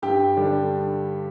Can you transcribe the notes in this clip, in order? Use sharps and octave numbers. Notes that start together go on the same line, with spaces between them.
G2 G4
D3 G3 D4